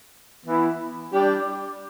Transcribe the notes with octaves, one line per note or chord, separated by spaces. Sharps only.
E3 B3 E4
G3 D4 G4